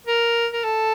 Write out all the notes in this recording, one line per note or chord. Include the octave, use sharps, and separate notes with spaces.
A#4
A#4
A4